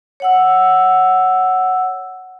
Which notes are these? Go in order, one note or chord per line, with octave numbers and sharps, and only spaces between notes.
C#5 F#5 E6